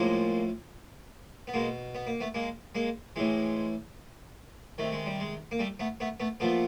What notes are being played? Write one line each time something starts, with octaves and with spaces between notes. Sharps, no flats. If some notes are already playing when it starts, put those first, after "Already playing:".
Already playing: A2 F3 G#3 A#3
B3
B2 G#3 A#3
B3
A#3
A3 B3
G#3 A#3
G#3 A#3
A2 E3 G#3
C3 D#3 A3
G#3
G3
G#3
A#3
G3 A3
A3 B3
A3 B3
A3 B3
A#2 F3 A3 B3